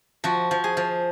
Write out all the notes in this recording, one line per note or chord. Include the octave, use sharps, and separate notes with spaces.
F3 F#4
F3
G#4
F3